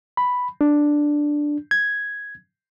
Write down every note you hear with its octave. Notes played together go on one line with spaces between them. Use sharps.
B5
D4
G#6